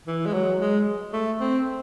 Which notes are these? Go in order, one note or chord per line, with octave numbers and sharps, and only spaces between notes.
E3
G#3
F#3
G#3
A3
C4